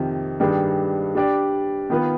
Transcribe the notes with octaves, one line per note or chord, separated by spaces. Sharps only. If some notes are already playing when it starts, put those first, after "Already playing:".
Already playing: F2 C3 D#3
G2 D#3 G3 D4 G#4
G3 D4 G4 D5
D#3 B3 F4 B4